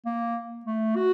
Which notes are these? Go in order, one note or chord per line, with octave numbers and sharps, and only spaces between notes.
A#3
A3
F#4